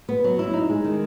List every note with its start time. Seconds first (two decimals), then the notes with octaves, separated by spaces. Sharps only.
0.09 B3
0.24 F#3
0.39 E4
0.54 D#4
0.70 G#3
0.84 D#3